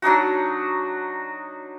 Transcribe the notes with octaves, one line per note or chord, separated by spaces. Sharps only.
F#3 D4 D#4 F#4